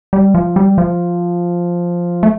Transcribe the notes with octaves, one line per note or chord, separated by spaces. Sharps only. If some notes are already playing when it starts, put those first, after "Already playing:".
G3
F3
G3
F3
A3